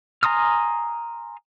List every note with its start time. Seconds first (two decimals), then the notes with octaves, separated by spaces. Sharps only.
0.23 G#5 A#5 C6 D#6 F6